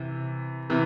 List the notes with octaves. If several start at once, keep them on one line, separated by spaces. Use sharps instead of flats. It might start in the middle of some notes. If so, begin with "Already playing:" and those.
Already playing: C3 E3
C3 E3